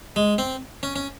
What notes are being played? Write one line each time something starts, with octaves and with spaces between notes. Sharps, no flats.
G#3
C4
C#4
C#4